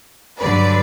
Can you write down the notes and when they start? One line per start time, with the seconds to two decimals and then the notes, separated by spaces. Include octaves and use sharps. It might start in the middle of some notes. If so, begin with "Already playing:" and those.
0.40 G2 D3 F#3 B4 D5